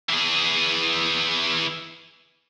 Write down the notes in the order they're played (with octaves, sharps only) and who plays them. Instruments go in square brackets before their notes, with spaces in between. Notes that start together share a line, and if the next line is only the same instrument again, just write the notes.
[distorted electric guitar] E3 G#4